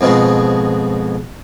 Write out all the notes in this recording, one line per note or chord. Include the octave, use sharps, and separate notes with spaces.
F2 G#2 B2 G#3